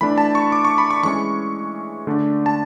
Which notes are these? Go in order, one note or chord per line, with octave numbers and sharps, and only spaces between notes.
E3 A3 D4 B5
A5
C#6
D6
C#6
B5
C#6
E3 G#3 C#4 C#6
D3 A3 D4
A5